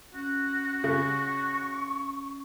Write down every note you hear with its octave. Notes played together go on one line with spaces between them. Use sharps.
C#4 F#4
C#3 C#6